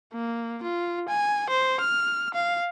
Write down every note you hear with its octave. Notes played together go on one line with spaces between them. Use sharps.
A#3
F4
G#5
C5
F6
F5